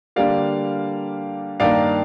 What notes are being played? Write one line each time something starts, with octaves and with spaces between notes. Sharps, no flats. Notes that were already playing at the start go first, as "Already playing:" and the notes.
D3 G3 A#3 D5 F5
G2 D#3 A#3 D5 F5